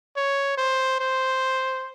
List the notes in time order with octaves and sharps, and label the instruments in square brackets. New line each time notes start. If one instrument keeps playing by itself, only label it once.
[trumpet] C#5
C5
C5